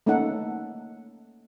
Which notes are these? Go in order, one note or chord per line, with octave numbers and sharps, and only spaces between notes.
A3 A#3 C#4 D#4 A4 F#5